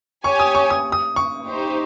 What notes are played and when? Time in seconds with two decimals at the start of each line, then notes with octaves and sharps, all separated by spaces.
0.24 G4 C#5 G#5 C#6
0.39 D#6
0.55 C#6
0.70 D#6
0.92 D#6
1.16 C#6
1.47 D#4 G4 C5